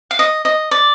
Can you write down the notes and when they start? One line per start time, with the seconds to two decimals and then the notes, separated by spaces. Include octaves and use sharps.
0.11 F5
0.19 D#5
0.45 D#5
0.71 D5